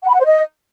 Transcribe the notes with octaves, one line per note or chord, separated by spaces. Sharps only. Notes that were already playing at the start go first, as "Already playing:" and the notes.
F#5
B5
F#5
C5
D#5